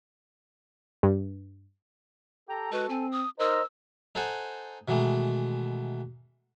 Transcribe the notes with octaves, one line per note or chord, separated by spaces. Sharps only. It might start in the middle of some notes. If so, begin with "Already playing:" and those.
G2
G4 A4 G5 A#5
G#3 F#4 B4
C4 G#5
D#6
D#4 A#4 C5 D#5 A#5 E6
D#4 A4 C5 F#5 G#5
B2 D#3 E3 G#3 A3